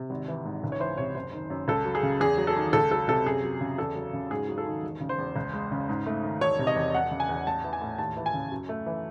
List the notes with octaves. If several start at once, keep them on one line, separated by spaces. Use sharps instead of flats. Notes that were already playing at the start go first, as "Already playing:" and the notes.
Already playing: C3
G#1
E3
G#2
C#2
C#5
E3 C5
C3 C#5
F#1 C5
D#3
F#2
C#2 A4
F#3
G#4
C#3
E2 G#4
F#3
A4
D#3
C#2 A4
F#3 A4
C3 A4
F#2 G#4
F#3
C#3
E2 A4
F#3
C#3
G#2 G#4
F#3
A4
D#3
E1
C#3
C5
E2
C#2
G#3
C#3
G#2
A3
D#3
E1 C#5
C3
D#5
E2
E1 F#5
C#3
G#5
E2
A1 A5
E3
G#5
A2
D#2 A5
E3
G#5
C#3
F#2
A3
E3